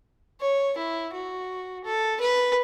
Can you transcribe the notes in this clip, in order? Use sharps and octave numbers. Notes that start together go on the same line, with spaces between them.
C#5
E4
F#4
A4
B4